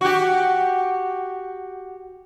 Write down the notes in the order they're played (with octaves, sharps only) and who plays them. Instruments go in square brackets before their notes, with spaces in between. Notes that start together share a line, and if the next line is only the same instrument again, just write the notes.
[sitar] F#4 G4